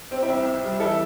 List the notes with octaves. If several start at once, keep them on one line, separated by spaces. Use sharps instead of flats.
C3 C4
C4 E4
C2
C2
G3
E3 E4 A4